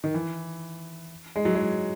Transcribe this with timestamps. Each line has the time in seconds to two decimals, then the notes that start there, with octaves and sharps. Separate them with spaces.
0.04 D#3
0.14 E3
1.36 G#3
1.45 F#3
1.55 G#3